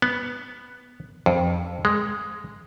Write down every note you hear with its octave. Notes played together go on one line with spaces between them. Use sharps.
B3
F2
G#3